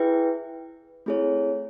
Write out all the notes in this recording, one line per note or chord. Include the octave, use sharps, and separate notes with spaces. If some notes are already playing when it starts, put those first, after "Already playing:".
Already playing: E4 G#4 B4 E5 G5
A3 C4 E4 G#4 C#5